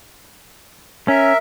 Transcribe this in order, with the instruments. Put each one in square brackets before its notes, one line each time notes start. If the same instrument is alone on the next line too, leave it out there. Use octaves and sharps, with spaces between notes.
[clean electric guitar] C#4 [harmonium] A#4 E5